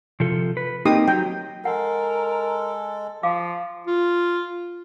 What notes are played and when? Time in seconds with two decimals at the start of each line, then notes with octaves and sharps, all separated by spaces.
0.20 C3 F3 A4
0.57 B4
0.85 A#3 C4 D#4 G4 D#6
1.08 F#3 G5
1.65 G#3 A4 A#4 F#5
3.23 F3 F5 D6
3.87 F4